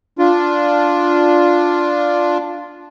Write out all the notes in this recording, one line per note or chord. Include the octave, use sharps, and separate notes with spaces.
D4 F4